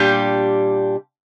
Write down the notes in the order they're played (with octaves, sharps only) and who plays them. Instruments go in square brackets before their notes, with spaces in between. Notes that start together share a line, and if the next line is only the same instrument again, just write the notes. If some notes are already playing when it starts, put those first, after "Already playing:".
Already playing: [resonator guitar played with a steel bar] A#2 G3 D4 G4